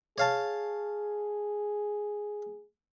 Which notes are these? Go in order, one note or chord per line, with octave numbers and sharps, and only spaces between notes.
G#4 C#5 F5 A5